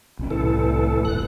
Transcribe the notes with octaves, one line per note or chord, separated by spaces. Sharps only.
B1 C#4
C2 A2 E3 A4
D#1 G#1 F#6